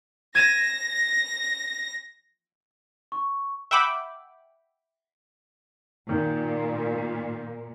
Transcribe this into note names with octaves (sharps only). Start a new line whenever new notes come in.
G#6 A#6 D#7 E7
C#6
E5 F#5 G5 B5 D6
A#2 D#3